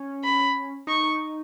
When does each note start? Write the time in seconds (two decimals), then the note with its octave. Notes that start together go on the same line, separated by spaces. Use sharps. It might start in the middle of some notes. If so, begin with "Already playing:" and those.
Already playing: C#4
0.24 B5
0.87 D#4 C#6